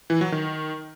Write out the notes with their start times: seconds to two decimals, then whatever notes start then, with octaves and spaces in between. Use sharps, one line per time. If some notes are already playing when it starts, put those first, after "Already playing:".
0.10 E3
0.21 F#3
0.32 D#3